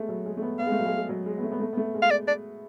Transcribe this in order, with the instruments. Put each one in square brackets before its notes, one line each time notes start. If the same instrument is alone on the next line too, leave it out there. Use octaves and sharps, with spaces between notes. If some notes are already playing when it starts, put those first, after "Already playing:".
Already playing: [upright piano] G#3 A3 B3
F#3
G#3
A3
B3
[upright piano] B3 [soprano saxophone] F5
[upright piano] G#3
A3
F#3
G#3
G#3
F#3
G#3
B3
A3
B3
A3
B3
A3
G#3
[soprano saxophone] F5
D5
D5